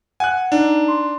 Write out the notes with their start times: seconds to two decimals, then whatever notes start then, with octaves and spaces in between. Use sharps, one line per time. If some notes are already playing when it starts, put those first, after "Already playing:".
0.20 F#5 G#5 F#6
0.52 D4 D#4
0.88 C6